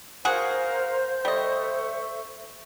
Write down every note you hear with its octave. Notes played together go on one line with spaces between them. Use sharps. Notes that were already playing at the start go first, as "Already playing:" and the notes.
F#4 G#4 A#4 C5 F5 F#5
G3 A4 D#5 E5 C#6